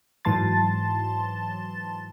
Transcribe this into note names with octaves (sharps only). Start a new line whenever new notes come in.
G#2 E3 F#3 A5 C6 A6